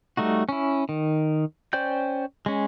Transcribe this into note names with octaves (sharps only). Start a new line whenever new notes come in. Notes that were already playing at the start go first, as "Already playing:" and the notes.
G3 A3 D#4 F#4
C#4 E4
D#3
C#4 C5 D5 G5 G6
G#3 C#4